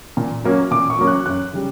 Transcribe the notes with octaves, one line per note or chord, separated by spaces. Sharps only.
A#2
F#3 A#3 C#4
A#2 D6
C#6
F#3 A#3 C#4
F#6
F#2 F#6
C#3 G3